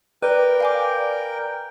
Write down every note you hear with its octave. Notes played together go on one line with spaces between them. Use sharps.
A#4 B4 D5 G5
F5 G#5 D6